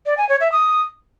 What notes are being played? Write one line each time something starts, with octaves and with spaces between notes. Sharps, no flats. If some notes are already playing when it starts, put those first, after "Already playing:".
D5
G#5
C#5
E5
D#6